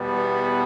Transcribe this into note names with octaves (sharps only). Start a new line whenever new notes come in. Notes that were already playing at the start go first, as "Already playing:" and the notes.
Already playing: E2 B2 G3 B3